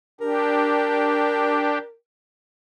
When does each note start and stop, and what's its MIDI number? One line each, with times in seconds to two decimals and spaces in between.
0.21 1.78 62
0.21 1.78 67
0.21 1.95 70